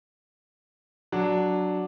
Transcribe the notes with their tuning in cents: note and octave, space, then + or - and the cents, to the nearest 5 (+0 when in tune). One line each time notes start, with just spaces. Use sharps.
F#3 +0 D4 +0